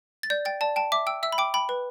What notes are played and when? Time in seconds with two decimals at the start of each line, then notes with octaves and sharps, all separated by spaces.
0.23 A6
0.30 D5 G6
0.45 G5 A6
0.61 D5 A5
0.76 G5 A5
0.92 E5 D6
1.07 G5 E6
1.23 E5 E6
1.32 B5
1.38 G5 D6
1.54 G5 B5
1.69 B4